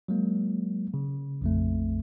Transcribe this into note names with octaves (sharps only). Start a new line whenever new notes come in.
F#3 G#3 A#3
C#3
A#1 F2 A3